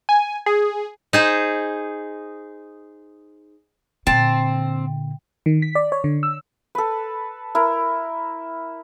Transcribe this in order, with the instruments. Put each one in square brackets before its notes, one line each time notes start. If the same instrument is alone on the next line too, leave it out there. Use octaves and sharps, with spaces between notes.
[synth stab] G#5
G#4
[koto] D#4 G#4 C5
[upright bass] A#2 D3 [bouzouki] C4 [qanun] A5
[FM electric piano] D#3
B6
D5
C#5
D3
E6
[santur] A4 B4
E4 A#4